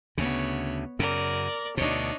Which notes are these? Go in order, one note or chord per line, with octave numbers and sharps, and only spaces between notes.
D2 C#3 B3 C#5
F#2 C#3 A#4 D5
D2 B2 D4 D#4 C#5